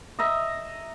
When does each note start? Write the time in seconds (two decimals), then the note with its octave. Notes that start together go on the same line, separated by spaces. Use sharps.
0.19 D#5 E5 A#5